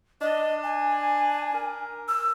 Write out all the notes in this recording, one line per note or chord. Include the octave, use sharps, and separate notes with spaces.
D4 D#5
G#5
A#4
E6